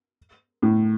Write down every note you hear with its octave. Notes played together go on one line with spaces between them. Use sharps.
A2